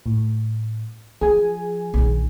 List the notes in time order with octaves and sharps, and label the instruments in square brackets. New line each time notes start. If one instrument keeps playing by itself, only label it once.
[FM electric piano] A2
[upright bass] F3 [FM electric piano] G#4 G#5
[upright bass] A#1 D#3